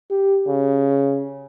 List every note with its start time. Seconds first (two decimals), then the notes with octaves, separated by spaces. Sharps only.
0.11 G4
0.47 C#3